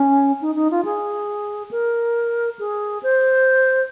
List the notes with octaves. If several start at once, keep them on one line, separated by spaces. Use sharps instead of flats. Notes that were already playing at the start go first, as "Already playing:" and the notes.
Already playing: C#4
D#4
D#4
F4
G#4
A#4
G#4
C5